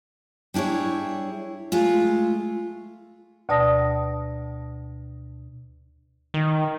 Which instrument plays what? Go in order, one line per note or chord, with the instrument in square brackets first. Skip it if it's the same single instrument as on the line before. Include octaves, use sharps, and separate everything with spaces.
[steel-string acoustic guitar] G3 D4 E4 G#4 C#5
G#3 A3 F4
[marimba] D2 B2 D5 A5 D#6 A#6
[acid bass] D#3